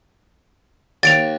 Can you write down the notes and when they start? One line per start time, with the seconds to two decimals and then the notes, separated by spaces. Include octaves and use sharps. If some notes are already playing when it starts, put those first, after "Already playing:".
1.03 D#2 A6 D7 F7